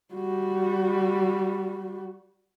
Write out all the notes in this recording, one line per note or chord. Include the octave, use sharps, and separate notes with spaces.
G3 F#4